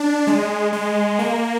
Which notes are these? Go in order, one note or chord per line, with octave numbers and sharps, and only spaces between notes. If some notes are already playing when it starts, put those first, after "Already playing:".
Already playing: D4
G#3
G#3
A#3